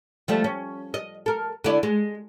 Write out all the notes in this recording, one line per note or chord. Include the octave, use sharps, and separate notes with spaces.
F3 G3 A3
C#4
D#5
A4 A#4
D3 E4 D5
G#3